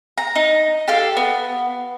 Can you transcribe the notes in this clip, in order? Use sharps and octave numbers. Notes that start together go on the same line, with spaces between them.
A#5
D#4
G4 A4 F5
B3